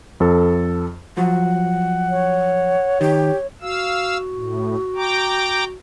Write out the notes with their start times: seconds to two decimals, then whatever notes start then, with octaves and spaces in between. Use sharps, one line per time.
0.20 F2 A4
1.17 F3 F#3 F#5
2.10 C#5
3.01 D#3 G4
3.62 F#4 F5 E6
4.32 A2
4.96 G5 A#5 D6